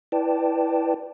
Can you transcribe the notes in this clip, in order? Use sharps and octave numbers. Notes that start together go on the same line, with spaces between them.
E4 B4 D5 G5 A5